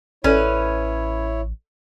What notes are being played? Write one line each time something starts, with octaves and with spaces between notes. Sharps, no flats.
A1 C#4 E4 A4 B4 C#5 D5